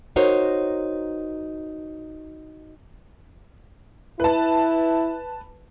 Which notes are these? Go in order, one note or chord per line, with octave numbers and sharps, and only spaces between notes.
D#4 F#4 A#4 C5 C#5
E4 B4 A5